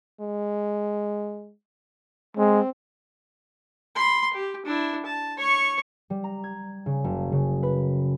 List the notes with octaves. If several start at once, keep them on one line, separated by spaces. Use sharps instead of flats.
G#3
G#3 C4
B5 C6
G4
D4 E4
A5
C#5 C#6
G3
A#5
G#6
C#3
F#1
C#3
B4